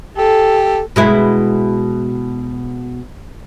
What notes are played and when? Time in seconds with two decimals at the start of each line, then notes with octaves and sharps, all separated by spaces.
0.17 G4 A4
0.96 B2 G#3 E4